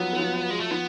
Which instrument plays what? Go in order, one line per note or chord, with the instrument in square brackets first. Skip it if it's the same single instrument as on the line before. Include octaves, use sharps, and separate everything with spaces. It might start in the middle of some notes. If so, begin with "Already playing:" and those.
Already playing: [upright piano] F3 F#3 [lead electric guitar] B3
[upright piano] F#3
F3
[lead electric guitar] G#3
A3
[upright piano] F3 [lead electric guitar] B3